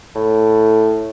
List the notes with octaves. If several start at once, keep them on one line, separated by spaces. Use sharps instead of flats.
A2